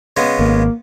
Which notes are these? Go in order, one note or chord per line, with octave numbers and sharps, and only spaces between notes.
C#3 G#3 B3
G#1 A#3